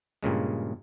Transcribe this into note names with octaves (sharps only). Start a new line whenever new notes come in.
G2 A#2 C#3 G#3